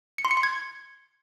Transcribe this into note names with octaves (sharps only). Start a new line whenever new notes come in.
C#7
C6
C#7
C6
G#6